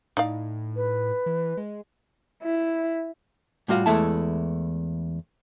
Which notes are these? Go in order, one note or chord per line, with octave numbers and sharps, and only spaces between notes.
A2 D#4 D5 F5
B4
E3
G#3
E4
A2 G3 F4 F#4 F5
E2 G#3 A3 E4 A5